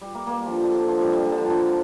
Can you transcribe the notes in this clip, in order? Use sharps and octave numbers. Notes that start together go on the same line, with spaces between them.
G3
A#3
A#3
G3
D3 F3
D3
D3
F3
G3
G3
G3
D3
F3
D3